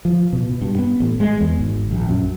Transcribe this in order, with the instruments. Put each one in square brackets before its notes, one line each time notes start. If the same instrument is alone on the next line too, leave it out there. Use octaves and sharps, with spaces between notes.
[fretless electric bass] F3
B2
B2
G2
B3
A1
G#3
E2
G#1
A#1
F#2